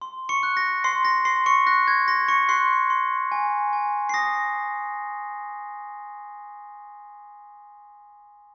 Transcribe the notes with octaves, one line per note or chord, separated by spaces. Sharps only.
C6
C#6 C#7
F#6
A#6
C6 C7
A#6
C6 C7
C#6 C#7
F#6 A#6
G#6
C6 A#6
C#6 C#7
C6 F#6 C7
C6
G#5
G#5
C7
D#6 A#6